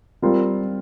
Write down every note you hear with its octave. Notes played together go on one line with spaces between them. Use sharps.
G3 C4 F4 A#4